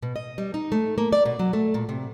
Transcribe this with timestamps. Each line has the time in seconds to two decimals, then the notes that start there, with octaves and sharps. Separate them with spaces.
0.03 B2
0.16 D#5
0.38 G3
0.54 D#4
0.72 A3
0.98 A#3
1.12 D5
1.25 B2
1.39 F#3
1.53 A3
1.74 A#2
1.89 C3